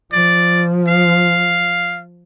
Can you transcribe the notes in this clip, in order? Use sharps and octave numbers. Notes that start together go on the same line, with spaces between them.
F3 D5
F5